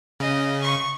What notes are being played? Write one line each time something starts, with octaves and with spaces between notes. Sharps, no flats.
C#3 D#5
C#6